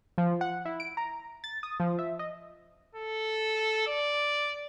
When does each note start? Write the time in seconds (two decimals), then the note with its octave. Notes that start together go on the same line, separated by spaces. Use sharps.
0.18 F3
0.41 F#5
0.65 E4
0.80 D7
0.97 A#5
1.44 A6
1.63 D#6
1.80 F3
1.99 E5
2.19 D#5
2.96 A4
3.87 D5